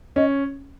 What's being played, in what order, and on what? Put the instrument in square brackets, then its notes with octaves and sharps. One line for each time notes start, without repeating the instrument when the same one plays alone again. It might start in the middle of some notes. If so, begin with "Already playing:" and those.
[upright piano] C#4 [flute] D#5